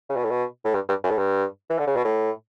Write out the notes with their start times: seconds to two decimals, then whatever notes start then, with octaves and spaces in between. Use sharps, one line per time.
0.10 C#3
0.17 B2
0.24 A2
0.30 B2
0.65 A2
0.75 G2
0.89 G2
1.04 F#2
1.11 A2
1.18 G2
1.70 E3
1.79 D3
1.87 C#3
1.96 B2
2.05 A2